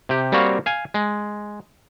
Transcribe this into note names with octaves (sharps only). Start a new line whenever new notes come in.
C3 G4
G3 A#3 C4 F#4 C#5 F5
F5 G#5
G#3